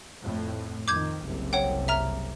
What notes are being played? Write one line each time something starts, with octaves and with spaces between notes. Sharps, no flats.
F2 A2
F2 D#3 D6 G6 G#6
F#1 C2 C3
C#5 F#5 G5
E5 A#5 F6